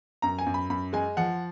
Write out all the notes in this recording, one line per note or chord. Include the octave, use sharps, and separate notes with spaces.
F#2 A#5
G#5
F#2
B5
F#2 B5
G#3 G#5
F3 F#5